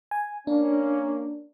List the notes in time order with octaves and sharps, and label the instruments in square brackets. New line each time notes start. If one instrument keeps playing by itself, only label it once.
[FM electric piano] G#5
[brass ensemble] A#3 C#4 [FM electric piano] D4